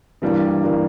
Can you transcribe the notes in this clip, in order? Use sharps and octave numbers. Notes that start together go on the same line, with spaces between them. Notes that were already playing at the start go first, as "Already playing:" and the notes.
G2 E3 G3 A#3 D4
E3 G3 A#3 D4